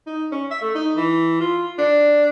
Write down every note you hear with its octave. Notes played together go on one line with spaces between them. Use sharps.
D#4
C#4
E5
A3
D#4
E3
F4
D4